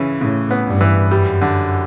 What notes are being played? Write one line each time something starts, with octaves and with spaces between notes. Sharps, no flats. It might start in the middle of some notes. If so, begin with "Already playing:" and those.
Already playing: C#3 E3
A2 C#3
B3
G2
E3
F#2 G3
D3